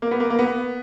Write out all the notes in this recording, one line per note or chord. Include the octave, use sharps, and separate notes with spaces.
A#3
B3
A#3
A#3
B3